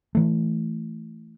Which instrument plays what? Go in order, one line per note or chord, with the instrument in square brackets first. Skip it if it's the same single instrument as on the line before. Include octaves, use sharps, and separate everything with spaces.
[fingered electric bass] E3 A3